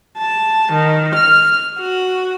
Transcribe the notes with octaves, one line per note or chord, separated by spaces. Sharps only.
A5
D#3
F6
F#4